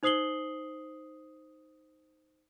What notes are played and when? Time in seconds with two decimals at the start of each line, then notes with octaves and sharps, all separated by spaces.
0.03 D#4 C5 D#6 C7 F#7 G7